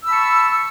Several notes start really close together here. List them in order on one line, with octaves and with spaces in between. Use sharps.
E6 B5 A5 C#6